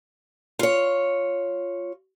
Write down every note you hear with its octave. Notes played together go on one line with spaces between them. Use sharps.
F4 C#5